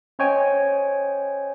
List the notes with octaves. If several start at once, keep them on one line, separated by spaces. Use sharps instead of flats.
C#4 C5 C#5 D#5 G5 G#5